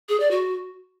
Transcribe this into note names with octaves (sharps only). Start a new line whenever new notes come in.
G#4
D5
F#4